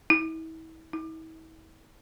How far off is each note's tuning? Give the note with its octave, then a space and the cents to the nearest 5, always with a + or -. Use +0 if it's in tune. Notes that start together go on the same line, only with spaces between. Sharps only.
E4 -40
E4 -45